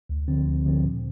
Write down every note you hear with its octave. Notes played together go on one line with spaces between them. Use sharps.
D2
D3 F3 C4
D2
D3 F3 C4
A#2